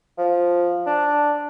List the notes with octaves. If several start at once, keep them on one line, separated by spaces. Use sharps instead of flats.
F3
D4